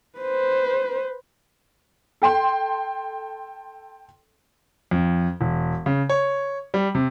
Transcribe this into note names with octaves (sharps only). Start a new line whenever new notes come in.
B4 C5
A4 G5 C6
F2
E1
C#3
C#5
G3
C3